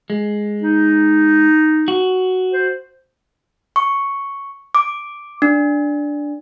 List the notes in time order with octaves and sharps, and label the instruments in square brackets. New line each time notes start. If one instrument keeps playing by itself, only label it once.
[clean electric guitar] G#3
[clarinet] D#4
[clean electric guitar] F#4
[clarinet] C5
[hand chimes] C#6
D6
D4